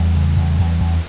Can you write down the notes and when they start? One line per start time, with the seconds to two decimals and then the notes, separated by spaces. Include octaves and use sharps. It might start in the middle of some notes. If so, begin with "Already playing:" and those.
Already playing: E2 G3
0.15 C#3
0.37 E2
0.59 E2
0.80 E2